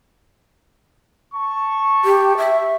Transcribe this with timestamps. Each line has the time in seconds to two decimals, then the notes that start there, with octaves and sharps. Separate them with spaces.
1.34 A5 C#6
2.05 G4
2.38 E5